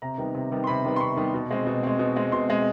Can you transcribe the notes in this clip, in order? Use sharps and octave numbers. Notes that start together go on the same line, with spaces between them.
C3 A#5
D#3 G3 B3
C3
D#3 G3 B3
C6
C3 B5
D#3 G3 B3
C6
C3 C#6
D#3 G3 B3
B2
G#3 C4
B2
G#3 C4
B2
G#3 C4
B2 C6
G#3 C4